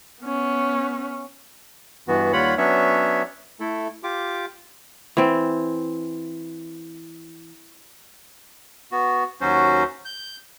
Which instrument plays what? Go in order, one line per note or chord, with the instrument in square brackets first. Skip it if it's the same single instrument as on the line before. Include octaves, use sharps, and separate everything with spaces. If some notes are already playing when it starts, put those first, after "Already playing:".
[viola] B3 C#4
[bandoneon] G2 E3 B3 F#4
D#2 G3 F4 C#5 F#5 B5
F#3 B3 C#4 D4 C#5 E5
A3 E4 A4
F4 G4 D6
[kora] E3 C4
[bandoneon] B3 F#4
D#2 F#3 C#4 F#4 C5
G6